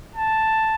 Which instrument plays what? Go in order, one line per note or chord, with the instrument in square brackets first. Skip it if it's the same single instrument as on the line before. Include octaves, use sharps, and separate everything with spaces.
[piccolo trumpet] A5